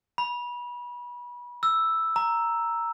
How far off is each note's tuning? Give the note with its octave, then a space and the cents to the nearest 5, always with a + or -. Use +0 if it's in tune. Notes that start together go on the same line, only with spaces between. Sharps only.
B5 -30
E6 +0
A#5 -5